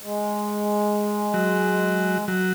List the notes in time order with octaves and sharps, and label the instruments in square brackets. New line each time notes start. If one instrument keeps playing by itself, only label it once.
[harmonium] G#3
[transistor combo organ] F#3
F#3